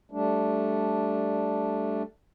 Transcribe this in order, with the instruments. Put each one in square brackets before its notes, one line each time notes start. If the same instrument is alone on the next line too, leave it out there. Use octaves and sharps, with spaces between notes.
[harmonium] G3 A3 D4